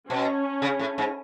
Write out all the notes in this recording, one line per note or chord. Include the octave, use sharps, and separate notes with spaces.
B2 C#4
C#3
A2
G#2